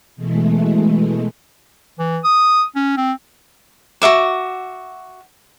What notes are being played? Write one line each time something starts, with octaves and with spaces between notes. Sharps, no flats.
B2 E3 G#3 A3
E3
D#6
C#4
C4
F#4 A4 E5 D6